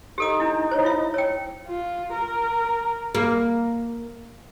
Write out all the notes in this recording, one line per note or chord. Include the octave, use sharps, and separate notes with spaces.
D#4 G4 A4 D#6
D4 E4
C5 C#5
E4 F4 E5
C#5 G5
F4
A#4
A#3